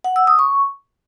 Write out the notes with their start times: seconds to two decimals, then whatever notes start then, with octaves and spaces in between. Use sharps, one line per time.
0.04 F#5
0.16 E6
0.27 D#6
0.39 C#6